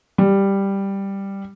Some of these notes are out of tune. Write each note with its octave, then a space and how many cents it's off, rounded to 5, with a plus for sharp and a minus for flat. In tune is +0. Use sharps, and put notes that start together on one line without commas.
G3 +5